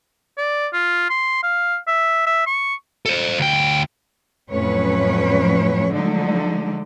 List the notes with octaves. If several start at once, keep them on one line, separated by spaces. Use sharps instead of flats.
D5
F4
C6
F5
E5
E5
C#6
A4 C5
D2 G5
F2 A2 F#3 C#4 B4 C#5
D3 F3 F#3 G#3 A3 D#4